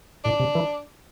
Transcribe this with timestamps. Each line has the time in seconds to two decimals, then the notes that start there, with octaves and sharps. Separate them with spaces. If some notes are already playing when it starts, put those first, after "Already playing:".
0.24 A2 D4
0.40 C3
0.55 E3